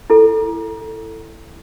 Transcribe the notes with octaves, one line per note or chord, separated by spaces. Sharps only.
E4 A4